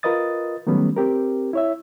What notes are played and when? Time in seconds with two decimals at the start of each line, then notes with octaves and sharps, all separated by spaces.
0.03 F4 A#4 B4 D#5 D#6 A6
0.67 D#3 F#3 G3 A3 B3 C#4
0.97 C4 G4 A#4
1.53 E4 C#5 E5